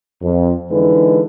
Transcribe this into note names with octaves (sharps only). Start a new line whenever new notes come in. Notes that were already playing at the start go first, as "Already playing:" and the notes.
F2
D3 E3 G#3 D#4 B4